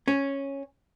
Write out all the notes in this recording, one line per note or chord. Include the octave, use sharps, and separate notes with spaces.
C#4